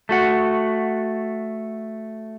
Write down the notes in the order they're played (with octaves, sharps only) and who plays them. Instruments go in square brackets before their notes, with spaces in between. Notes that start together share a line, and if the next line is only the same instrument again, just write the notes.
[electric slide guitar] A3 F#4 F#5